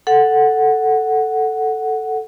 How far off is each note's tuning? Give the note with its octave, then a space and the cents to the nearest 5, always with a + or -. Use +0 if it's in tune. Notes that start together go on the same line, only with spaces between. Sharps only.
A4 +0 F#5 +0